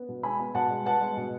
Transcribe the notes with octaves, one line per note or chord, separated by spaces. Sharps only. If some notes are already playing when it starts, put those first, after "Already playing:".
Already playing: B3
B2
G#3 G#5 B5
B3
B2 F#5 A5
G#3
B3 F#5 A5
G#3
B2